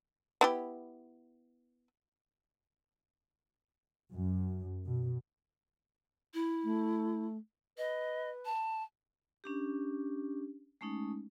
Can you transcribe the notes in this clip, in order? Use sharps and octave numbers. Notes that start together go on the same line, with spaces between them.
B3 E4 G4
F#2
B2
E4
A3
B4 D#5
A5
C#4 D4 G4
G#3 A3 C#4 D#4